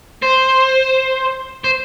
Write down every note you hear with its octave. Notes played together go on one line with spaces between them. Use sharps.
C5
C5